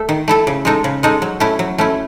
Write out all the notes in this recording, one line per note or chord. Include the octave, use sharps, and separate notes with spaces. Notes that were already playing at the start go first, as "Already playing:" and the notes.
Already playing: A3 A4
D#3
A3 E4 A4
C#3
G#3 D#4 A4
C#3
G#3 D#4 A4
F#3
A3 C#4 E4
F#3
A3 C#4 E4